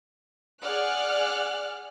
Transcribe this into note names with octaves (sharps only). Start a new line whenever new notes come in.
G#4 D5 F#5 F6 F#6